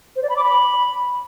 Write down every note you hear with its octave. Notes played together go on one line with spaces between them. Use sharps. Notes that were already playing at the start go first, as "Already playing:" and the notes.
C5
D5
B5
D6
B5